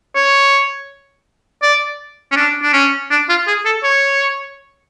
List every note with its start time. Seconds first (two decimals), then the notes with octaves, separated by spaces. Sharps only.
0.15 C#5
1.62 D5
2.31 C#4
2.36 D4
2.63 D4
2.73 C#4
3.11 D4
3.29 F4
3.47 G#4
3.65 A4
3.84 C#5